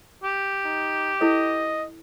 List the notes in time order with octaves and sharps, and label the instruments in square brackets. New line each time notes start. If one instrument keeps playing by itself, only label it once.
[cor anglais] G4
[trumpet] D#4
[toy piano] E4 A4 C5 [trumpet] D#5